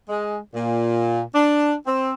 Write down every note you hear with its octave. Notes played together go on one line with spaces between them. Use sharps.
G#3
A#2
D4
C4